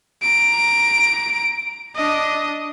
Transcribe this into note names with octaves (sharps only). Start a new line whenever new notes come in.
A#5 D7
D4 D#5